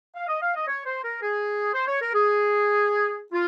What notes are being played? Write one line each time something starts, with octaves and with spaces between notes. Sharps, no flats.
F5
D#5
F5
D#5
C#5
C5
A#4
G#4
C5
C#5
A#4
G#4
F4